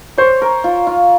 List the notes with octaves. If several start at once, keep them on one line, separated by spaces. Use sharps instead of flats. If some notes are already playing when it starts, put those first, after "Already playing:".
C5 C#5
A#4
F4
F4